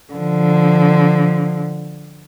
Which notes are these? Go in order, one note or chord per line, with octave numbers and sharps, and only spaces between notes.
D3 F3